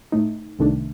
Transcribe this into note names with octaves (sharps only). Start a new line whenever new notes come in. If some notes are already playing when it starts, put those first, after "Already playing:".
A2 A3 D#4
C2 C3 D#3 A3 D4